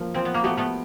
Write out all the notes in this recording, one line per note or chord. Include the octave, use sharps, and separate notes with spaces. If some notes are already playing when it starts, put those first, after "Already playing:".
Already playing: F3 A#3
F3 C4
B3
A#3
A3 B3 G4
A3 B3